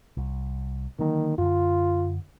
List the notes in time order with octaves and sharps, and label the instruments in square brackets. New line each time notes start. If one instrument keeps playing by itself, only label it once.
[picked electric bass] C2
[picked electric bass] D3 F#3 A#3 [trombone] D#3
[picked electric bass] F#2 D3 [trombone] F4